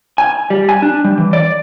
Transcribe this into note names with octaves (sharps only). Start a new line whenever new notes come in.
G#5
G3
G#5
D4
G3
E3
D5